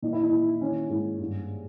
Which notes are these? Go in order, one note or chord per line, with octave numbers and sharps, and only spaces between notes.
A#2 D#4
E4
D#4
A#2
D#3 C#4
G#2
G2